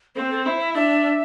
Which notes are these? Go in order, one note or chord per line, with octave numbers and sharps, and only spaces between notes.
C4 C5
A4
E4 C5
E5
D4 E5